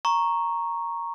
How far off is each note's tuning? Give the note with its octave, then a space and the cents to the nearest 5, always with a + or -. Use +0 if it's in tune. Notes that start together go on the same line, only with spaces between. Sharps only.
A#5 +0 C#6 -5